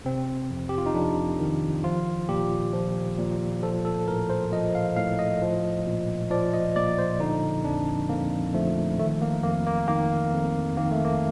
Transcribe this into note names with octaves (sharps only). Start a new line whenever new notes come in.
C3 C4
F2
G4
F4
D#4
F2 D4
D#3
F3 F4
A#2 G4
F3
A#2
F3 A4
A4
A2 A#4
C5
F3 D#5
F5
A2 F5
D#5
F3
A#2
F3 D5
D#5
A#2 D5
C5
D3 D#4
F2 D4
F2 A#3
F3 A3
D#3 A3
A#3
F2 A#3
A#3
D#3 A#3
F2
D#3 A#3
A3
A#3